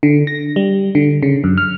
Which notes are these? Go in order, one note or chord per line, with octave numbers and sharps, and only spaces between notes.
D3
A#6
G3
D3
C#3
F#2
F6